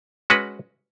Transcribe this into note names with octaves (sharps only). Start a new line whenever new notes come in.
G#3 C#4 F#4 B4